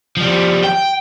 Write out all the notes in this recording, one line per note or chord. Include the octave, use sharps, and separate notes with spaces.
F3 G3
G5